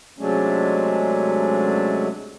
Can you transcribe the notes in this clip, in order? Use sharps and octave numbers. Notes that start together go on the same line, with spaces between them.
C3 F#3 G#3 A3 C#4 D4